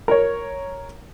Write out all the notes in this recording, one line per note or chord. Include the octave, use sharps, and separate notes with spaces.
A#4 C#5